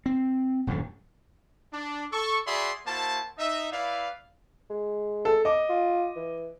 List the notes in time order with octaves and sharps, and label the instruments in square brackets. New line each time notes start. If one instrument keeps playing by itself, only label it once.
[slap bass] C4
D#1 F#2 A2 D3
[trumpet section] D4
A4 C#6
F#4 G#4 D5 E5 B5 C6
A#3 E4 F#4 C5 A5
D#4 D#5 E5
E4 B4 D5 F5
[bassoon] G#3
[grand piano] A4
D#5 D6
[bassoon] F4
E3